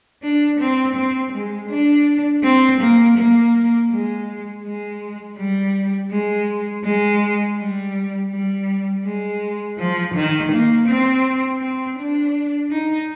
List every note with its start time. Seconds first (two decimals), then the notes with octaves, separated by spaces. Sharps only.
0.22 D4
0.60 C4
0.96 C4
1.33 G#3
1.69 D4
2.43 C4
2.81 A#3
3.17 A#3
3.90 G#3
4.64 G#3
5.37 G3
6.11 G#3
6.84 G#3
7.58 G3
8.31 G3
9.05 G#3
9.78 F3
10.14 D#3
10.52 A#3
10.88 C4
11.61 C4
11.98 D4
12.71 D#4